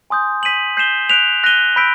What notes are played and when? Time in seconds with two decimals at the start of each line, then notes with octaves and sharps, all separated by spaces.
0.10 G#5 C6 D#6 G6
0.43 G6 B6 D#7 F#7
0.77 G6 C7 E7 G7
1.10 F#6 B6 D7 F7
1.44 F#6 A#6 D#7 G7
1.76 B5 E6 G6 B6 D7